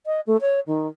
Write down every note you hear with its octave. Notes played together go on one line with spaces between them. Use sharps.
D#5
A3
C#5
D#3